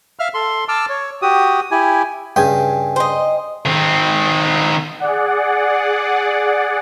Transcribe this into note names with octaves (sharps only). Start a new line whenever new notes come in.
E5 F5 F6
A4 C6
A5 D6 E6 F6
C#5
F#4 G4 D#6
E4 G4 G#5
G2 C#3 G5 G#5 D#6
C5 D#5
D#3 C4
G#4 D5 F#5